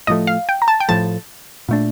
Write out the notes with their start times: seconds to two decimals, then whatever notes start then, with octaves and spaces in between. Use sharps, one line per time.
0.07 A2 F3 A3 D#5
0.27 F5
0.49 G5
0.62 A#5
0.68 A5
0.80 G5
0.89 A2 F3 A3 A5
1.69 A#2 A3 D4